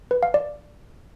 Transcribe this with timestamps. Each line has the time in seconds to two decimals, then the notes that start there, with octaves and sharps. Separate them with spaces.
0.11 B4
0.23 F5
0.34 D5